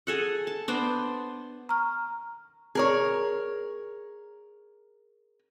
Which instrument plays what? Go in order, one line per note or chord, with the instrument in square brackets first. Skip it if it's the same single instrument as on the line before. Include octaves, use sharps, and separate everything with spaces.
[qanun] G#4 A4 F#5
A5
B3 D4 C5
[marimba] A#5 C#6 F6
[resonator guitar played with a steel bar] G#4 A#4 C#5